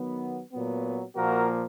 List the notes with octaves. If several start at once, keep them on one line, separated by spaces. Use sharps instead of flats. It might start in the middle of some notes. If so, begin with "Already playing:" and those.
Already playing: D#3 F#3 B3
A#2 F#3 B3
A#2 F3 A#3 F#4 A#4